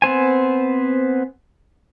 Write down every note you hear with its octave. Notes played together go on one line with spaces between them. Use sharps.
B3 C4 C5 G#5